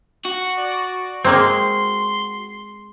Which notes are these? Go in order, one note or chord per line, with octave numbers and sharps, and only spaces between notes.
F#4
D5
G#3 A#3 C4 C6